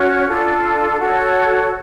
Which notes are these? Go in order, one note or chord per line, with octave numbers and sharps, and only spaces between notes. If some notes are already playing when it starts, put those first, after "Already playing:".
Already playing: C#4 F#4 C#5
D4 F4 A4
F#4 A4 C#5